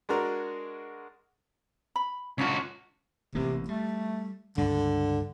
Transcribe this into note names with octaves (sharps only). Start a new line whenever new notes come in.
G#3 D4 F#4 A#4
B5
C#2 C#4 D4 F4 F#4
A1 C3 E3 A#3
G3 A3
C#2 G2 D3